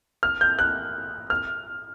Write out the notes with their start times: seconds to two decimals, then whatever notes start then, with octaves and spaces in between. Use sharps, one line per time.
0.23 F6
0.41 G6
0.59 F#6
1.30 F6